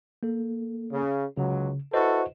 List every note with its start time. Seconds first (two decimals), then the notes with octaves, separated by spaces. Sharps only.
0.23 A#3 A4
0.92 C#3
1.37 C#2 C#3 F#3
1.93 E4 F#4 A4 B4 C5 D#5